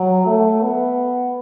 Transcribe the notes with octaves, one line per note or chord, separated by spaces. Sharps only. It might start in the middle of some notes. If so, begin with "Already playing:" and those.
Already playing: F#3
A3
B3